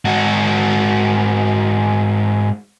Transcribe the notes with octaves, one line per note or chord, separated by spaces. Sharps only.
G#2 F#4